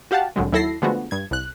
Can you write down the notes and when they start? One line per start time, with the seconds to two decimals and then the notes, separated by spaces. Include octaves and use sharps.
0.11 F#4 G4 F5 F#5 A5
0.36 C2 A2 D3 F#3 G#3
0.52 D#2 F#3 E4 A4 A#6 C7
0.82 D3 F3 G#3 A3 B3 F#4
1.11 G2 G#6
1.31 C2 F#6